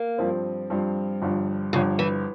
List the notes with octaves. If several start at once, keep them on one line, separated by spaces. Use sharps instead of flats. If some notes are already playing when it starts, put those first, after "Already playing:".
Already playing: A#3
G2 F3 C4
G2 F3 C4
G1 G2 F3
G1 G2 C#3 F3
E3